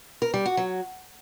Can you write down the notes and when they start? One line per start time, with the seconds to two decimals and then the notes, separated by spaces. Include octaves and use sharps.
0.22 A#4
0.34 G3
0.45 F#4
0.57 F#3